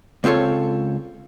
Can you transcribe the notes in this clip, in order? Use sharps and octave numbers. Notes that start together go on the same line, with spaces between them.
C#2 C4 F4 A4 C#5